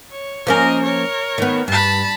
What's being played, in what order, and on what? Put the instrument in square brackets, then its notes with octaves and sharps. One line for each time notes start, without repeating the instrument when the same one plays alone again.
[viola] C#5
[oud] F3 A#3 C#4 [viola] A#4 D#5
[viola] A#4 C#5
[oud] D#3 B3
[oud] G2 [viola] A5 B5